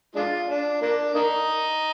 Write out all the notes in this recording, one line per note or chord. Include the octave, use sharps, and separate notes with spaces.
G#3 D4 F4
D4
A#3 D4
A#3 D#4